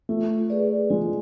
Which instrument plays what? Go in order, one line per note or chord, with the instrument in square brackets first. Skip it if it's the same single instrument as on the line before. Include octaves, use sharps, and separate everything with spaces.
[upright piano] A3 [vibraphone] F4
[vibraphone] G#4 B4 D5
[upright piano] G#3 [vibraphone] F4